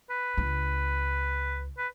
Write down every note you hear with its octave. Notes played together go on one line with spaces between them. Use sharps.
B4
C#2 D4
B4